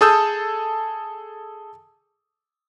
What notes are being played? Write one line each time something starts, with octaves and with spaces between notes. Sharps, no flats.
G#4 A4 A5 D#6 E6 G6